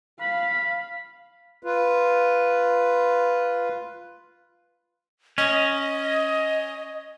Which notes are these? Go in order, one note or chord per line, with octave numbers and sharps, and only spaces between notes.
F5 B5
F4 B4
C#4 D#5